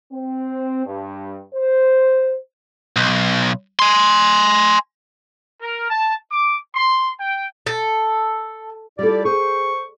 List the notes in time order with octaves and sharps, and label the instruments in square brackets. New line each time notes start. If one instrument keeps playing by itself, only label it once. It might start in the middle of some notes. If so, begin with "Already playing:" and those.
[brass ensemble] C4
G2
C5
[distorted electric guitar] B1
G#5 C6
[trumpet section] A#4
A5
D6
C6
G5
[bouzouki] A4
[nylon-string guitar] G3 F4 A4 [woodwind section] E4 G4 D5
[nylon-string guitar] G#4 [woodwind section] C5 C#6